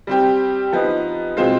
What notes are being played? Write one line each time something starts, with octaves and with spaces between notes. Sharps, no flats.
G3 C4 G4
F3 B3 D#4
B2 G#3 C4 F4 C5